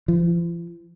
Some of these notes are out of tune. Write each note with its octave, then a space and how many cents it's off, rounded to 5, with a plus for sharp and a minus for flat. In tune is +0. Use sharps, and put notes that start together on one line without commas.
F3 -45